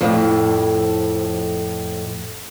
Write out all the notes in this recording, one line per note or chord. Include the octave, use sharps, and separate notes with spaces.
F2 A2